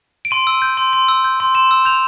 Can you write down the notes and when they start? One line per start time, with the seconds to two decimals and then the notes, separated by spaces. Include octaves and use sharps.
0.25 D7
0.31 C6 D#7
0.47 E6
0.62 G6
0.77 C6
0.93 C6
1.08 E6
1.24 G6
1.40 C6
1.55 C6 E7
1.71 E6
1.85 G6 F7